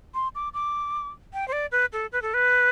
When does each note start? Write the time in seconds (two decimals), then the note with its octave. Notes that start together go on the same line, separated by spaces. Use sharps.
0.14 C6
0.35 D6
0.54 D6
1.33 G5
1.48 C5
1.52 D5
1.72 B4
1.93 A4
2.12 B4
2.22 A4
2.34 B4